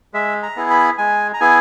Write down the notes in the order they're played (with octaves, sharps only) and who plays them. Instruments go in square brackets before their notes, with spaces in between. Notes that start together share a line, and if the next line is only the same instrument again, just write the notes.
[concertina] G#3 E5
A#5
B3 E4 G#4
B5
G#3 G#5
A#5
B3 E4 G#4 G#5